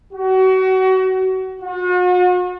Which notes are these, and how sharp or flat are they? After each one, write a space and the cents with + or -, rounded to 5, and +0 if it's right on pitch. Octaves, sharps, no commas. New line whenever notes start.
F#4 +30
F#4 -40